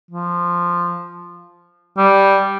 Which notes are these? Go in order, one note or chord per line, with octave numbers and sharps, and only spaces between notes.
F3
G3